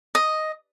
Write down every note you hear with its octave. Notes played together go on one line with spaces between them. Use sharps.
D#5